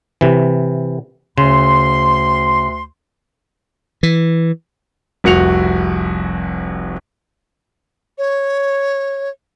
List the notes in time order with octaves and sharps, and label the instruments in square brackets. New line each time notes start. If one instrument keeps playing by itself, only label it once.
[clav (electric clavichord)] C3 E3
[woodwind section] D2 C6 [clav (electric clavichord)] C#3
[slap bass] E3
[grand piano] F1 C2 F#4 C#7 F7
[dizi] C#5